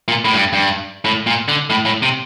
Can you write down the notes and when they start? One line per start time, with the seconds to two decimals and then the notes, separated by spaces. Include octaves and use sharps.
0.08 A#2
0.25 A2
0.34 G2
0.53 G2
1.05 A2
1.26 A#2
1.48 D3
1.70 A2
1.85 A2
2.02 C3